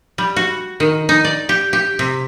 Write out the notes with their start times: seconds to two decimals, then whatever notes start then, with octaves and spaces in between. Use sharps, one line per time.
0.18 G3
0.36 F#4
0.80 D#3
1.09 D#4
1.25 D5
1.49 G4
1.73 G4
1.99 C3